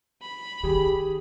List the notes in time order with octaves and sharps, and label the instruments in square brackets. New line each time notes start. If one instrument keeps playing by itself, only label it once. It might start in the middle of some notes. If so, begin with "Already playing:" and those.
[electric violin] B5
[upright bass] D#3 [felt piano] G4 G#4